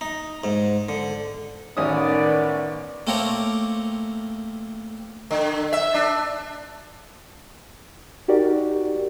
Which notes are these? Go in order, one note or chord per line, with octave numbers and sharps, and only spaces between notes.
D#4
G#2
D3
A1 D#3 B3 C#4 D5 D#6
A3 A#3 C4 A#4 C#5 D5
D3
E5
D4
D#4 F#4 G4 A#4 D5